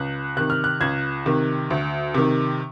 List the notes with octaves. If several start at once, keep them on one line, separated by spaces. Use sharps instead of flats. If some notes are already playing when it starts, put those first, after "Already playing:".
Already playing: C#2 F#6
C3 D#3 F#6
F6
F#6
C#2 G#6
C3 D#3
D2
C3 D#3